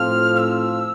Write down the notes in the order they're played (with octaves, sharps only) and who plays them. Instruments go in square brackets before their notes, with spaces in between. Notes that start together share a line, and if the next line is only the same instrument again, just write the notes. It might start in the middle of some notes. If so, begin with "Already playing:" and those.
Already playing: [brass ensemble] A2 F3 C4 F4 A4 [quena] F6
[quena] F6
E6